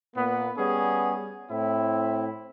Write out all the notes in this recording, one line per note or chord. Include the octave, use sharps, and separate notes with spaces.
A#2 A#3 B3
G3 B3 C#4 G#4
A2 C4 E4